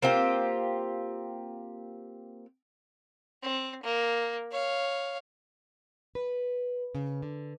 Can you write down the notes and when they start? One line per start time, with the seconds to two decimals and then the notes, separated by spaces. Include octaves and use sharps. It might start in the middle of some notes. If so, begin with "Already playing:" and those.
0.02 A#3 C4 F4 G4
3.42 C4
3.83 A#3
4.51 C#5 F5
6.15 B4
6.95 C#3
7.22 D3